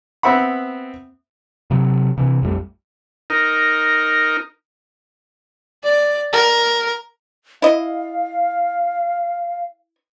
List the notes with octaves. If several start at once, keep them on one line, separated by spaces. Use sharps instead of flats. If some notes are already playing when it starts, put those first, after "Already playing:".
B3 C4 E5 F#5 B5
C3 F#3
C3 E3
A#1 F2 G3 A3
D#4 A#4
D5
A#4
E4 D#5 F5